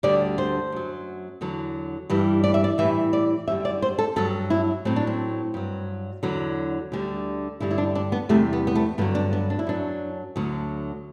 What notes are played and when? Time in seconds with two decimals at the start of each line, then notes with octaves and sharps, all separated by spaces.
0.03 D2 D3 G3 D5
0.38 C5
0.72 F#2 F#3
1.41 E2 D3 F#3
2.10 G2 E3 G3
2.44 D5
2.54 E5
2.64 D5
2.78 A2 E3 G3 E5
3.13 D5
3.48 F#2 D3 G3 E5
3.65 D5
3.82 C5
3.99 A4
4.16 G2 F#3 A4
4.50 E4
4.85 A2 F#3 C4
4.96 D4
5.07 C4
5.54 G2 F#3
6.23 E2 D3 F#3
6.92 D2 D3 G3
7.60 G2 D3 G3 E4
7.71 E4
7.78 D4
7.95 D4
8.12 B3
8.29 E2 C3 G3 A3
8.53 B3
8.67 B3
8.75 A3
8.98 G2 D3 F#3 B3
9.15 D4
9.33 B3
9.50 D4
9.59 E4
9.67 F#2 F#3 D4
10.36 D2 D3 F#3